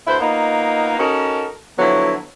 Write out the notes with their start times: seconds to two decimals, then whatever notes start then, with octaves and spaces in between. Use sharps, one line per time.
0.07 D2 E4 B4 C5
0.21 A#3 B3 D#4 F4 D#5
0.99 C#4 D#4 F#4 A4 A#4
1.79 D3 F3 F#3 B3 E4